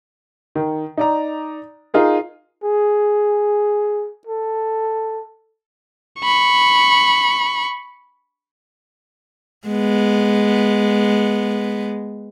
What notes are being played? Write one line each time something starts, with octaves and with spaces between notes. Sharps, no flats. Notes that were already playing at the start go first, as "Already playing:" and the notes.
D#3
D#4 D5 A#5
D#4 F4 G#4 A#4
G#4
A4
B5 C#6
G#3 B3